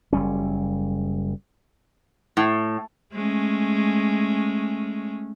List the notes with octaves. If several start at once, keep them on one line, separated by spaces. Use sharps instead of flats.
F#1 G3 C#4
A2
G#3 A3 C#4